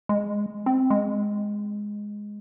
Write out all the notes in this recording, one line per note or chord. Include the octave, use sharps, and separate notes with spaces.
G#3
C4
G#3